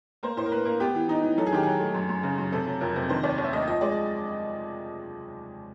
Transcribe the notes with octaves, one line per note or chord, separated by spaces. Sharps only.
A#3 C5
A2 C5
A#4
A#3 B4
A#3 A#4
B3 G4
E3
E3 D#4
E3
F#3 A4
G#4
D#3 G4
F#3 G#4
A3
F#2
F#2
C#3
F#2
C3 A4
F#3
F2 A#4
C3
D#3 C5
D#2 D5
D#2
E5
D#2 D#5
F3 D#5
G#3 D5